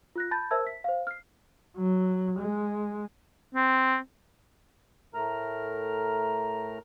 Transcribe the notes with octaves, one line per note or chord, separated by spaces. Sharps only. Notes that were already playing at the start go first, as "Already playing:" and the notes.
F4 F#6 A#6
A5 B5 G6 A6
A#4 C5 E5 A5 E6 G#6
B6
C5 F5
F6 C7
F#3
G#3
C4
A2 A3 A#4 A#5 F6